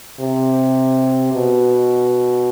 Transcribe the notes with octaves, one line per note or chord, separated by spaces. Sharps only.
C3
B2